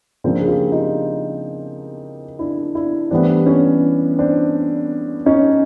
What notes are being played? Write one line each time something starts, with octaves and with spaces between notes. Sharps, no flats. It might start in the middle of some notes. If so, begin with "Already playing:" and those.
C#3 F3 A#3 C4 D4
G#4
F4 G4
D#4 F4
D4 E4
D4 E4
A2 E3 G3 B3 C4 D4
C#4
C4 D4
C#4 D#4